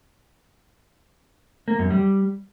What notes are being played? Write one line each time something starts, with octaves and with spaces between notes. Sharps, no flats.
A#3
F#2
G3